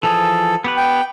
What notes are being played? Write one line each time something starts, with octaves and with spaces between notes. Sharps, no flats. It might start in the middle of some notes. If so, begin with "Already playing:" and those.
E3 F3 G#4 A4
B3 G4 B4
G5